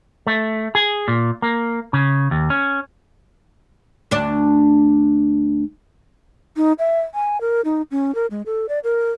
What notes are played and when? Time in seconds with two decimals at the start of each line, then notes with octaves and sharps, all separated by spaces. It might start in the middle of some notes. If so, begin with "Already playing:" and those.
0.27 A3
0.75 G#4
1.08 A#2
1.42 A#3
1.93 C#3
2.31 D#2
2.50 C#4
4.11 D2 D4
6.57 D#4
6.79 E5
7.14 G#5
7.41 A#4
7.65 D#4
7.91 C#4
8.15 A#4
8.31 G#3
8.46 A4
8.69 D5
8.84 A#4